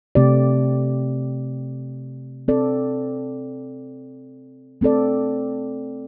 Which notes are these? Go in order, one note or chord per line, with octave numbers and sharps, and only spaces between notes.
C3 A3 C4 G4 D5
C4 A4 D5
A3 C4 A4 D5